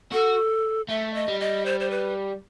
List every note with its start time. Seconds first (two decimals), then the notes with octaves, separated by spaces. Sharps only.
0.12 F#4 A4
0.89 A3 E5
1.14 D#5
1.28 G3
1.41 D#5
1.66 C5
1.80 C5
1.91 B4